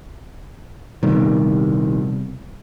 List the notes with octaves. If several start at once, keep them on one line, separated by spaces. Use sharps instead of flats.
A#1 C3 D#3 G3 B3